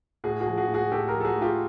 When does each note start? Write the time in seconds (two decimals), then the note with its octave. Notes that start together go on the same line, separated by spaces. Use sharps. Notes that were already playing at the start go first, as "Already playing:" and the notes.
0.24 A2 F#4 G#4
0.41 F#4 G#4
0.47 F3
0.57 F#4 G#4
0.68 A2
0.74 F#4 G#4
0.92 A2 G4 A4
1.08 G#4 A#4
1.14 F3
1.20 A4
1.25 F#4 G#4
1.35 A3
1.41 F4 G4